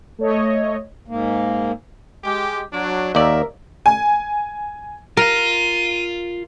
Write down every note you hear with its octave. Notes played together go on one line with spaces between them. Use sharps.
A3 C#5 D#5
G#2 A#3
G#3 G4
F#3 D4
D#2 A#4 D5 E5
G#5
F4 A#4 F5 D#7